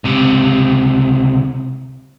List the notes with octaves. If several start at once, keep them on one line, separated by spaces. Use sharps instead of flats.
C#2 C3